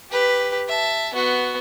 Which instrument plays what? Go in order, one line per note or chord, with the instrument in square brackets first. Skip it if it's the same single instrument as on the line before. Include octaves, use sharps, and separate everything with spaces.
[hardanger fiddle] G4 B4
E5 A5
B3 F#4